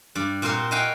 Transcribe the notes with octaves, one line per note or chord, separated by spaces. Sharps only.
G2 D5
A#2 C4 F#4 A#4 C6
F#4 B4 D#5 F5 G5 G#5